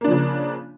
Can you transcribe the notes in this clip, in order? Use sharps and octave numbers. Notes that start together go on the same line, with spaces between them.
C#3 F3 A#3 D4